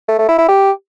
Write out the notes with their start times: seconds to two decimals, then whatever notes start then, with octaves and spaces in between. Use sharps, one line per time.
0.09 A3
0.19 A3
0.29 E4
0.39 E4
0.49 G4